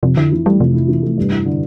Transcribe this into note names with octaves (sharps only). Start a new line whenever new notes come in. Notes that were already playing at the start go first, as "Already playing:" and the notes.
F2 C3
D3 E4
E3
G3 A3
F2 C3
E4
E3
A3
G2
E4
D3